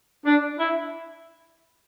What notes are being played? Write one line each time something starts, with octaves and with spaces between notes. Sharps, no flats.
D4
E4